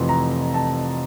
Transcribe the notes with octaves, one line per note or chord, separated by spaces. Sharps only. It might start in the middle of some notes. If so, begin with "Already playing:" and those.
Already playing: F1 F2 E3 C6
A#5
A5